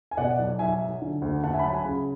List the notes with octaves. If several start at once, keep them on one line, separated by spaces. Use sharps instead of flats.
G#5
B2 D5 F#5
B1
B1 E5 G#5
F#3
D3
D2
D2 F#5 A5
E5 G#5
B5
F#3 F#5 A5
G#5 B5
C#3